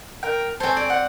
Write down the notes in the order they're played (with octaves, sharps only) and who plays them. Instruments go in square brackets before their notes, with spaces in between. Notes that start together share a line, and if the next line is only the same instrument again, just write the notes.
[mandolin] A#4 G5
[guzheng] C4 C5 [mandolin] A4 C#5 G#5
[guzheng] D5
[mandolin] F#5